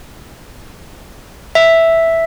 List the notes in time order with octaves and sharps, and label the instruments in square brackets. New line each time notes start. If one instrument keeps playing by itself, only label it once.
[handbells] E5